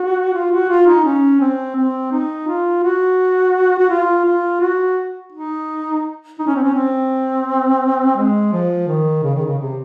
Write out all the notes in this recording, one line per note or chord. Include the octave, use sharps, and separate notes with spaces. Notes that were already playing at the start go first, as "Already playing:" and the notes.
Already playing: F#4
F4
F#4
F4
D#4
C#4
C4
C4
D#4
F4
F#4
F#4
F4
F4
F#4
D#4
D#4
C#4
C4
C#4
C4
G#3
F3
D#3
C#3
D#3
C#3
C3